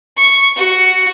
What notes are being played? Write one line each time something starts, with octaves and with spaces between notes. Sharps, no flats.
C#6
F#4